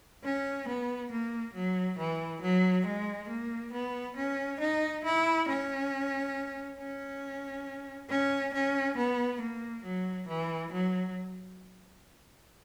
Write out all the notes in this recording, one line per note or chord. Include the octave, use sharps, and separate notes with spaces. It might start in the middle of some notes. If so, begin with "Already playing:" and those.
C#4
B3
A#3
F#3
E3
F#3
G#3
A#3
B3
C#4
D#4
E4
C#4
C#4
C#4
C#4
B3
A#3
F#3
E3
F#3